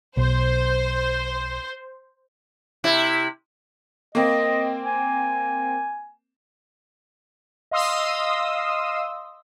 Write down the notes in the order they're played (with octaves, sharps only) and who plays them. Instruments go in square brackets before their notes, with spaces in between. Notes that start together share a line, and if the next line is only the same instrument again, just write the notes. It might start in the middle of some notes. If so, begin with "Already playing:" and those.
[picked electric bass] B1 [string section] C5
[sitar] C3 E4
[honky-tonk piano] A#3 C4 [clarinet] D#5
[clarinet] G#5
[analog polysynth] D#5 F5 C6 D#6 E6